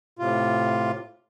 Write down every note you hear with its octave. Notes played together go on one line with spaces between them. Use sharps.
A2 C3 F4